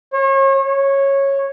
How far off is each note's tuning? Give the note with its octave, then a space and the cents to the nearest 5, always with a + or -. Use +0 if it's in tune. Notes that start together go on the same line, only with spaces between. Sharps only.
C#5 -35
C#5 -10